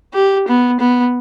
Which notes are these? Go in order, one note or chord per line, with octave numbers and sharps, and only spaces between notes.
G4
B3
B3